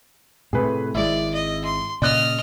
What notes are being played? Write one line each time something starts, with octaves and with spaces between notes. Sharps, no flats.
A2 C3 A3 G#4 B4
G#1 G#3 E4 D5
D#5
C6
A#2 C#3 D5 D#5 F6 F#6